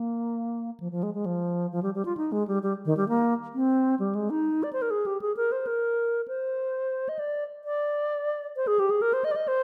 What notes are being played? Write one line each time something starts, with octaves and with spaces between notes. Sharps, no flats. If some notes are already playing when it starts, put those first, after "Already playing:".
Already playing: A#3
F3
F3
G#3
G#3
F3
F3
G3
G3
F4
D#4
G#3
G3
G3
D#3
G3
A#3
C4
G3
G#3
D#4
D5
C5
A#4
G#4
G4
G#4
A#4
C5
A#4
C5
D#5
D5
D5
C5
G#4
G4
G#4
A#4
C5
D#5
D5
D#5
C5